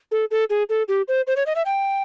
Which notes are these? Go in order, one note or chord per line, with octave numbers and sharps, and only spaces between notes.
A4
A4
G#4
A4
G4
C5
C5
C#5
D#5
E5
G5